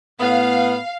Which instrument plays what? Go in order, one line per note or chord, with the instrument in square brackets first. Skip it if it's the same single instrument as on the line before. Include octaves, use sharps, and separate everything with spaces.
[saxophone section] A2 B3 [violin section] F5